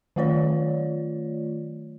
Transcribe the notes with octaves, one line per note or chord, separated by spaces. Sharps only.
D#3 F#3 A3 F4 C#5 D5